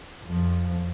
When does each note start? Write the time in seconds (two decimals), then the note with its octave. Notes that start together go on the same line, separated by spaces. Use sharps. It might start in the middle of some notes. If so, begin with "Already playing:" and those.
0.24 F2 F3